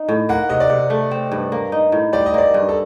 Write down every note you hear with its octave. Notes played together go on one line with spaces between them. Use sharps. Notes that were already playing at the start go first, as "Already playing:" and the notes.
Already playing: D#4
A2
A#3 F#5
C3 D#5
D5
C3
A3
C4
G2
A#3
D#4
A2
G3 D5
D#5
A#3 D5
G2
A4